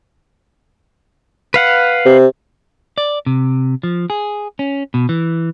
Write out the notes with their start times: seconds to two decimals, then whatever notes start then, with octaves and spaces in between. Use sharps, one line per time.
1.54 B4 F5 F#5
2.06 C3
2.98 D5
3.26 C3
3.83 F3
4.10 G#4
4.59 C#4
4.94 B2
5.09 E3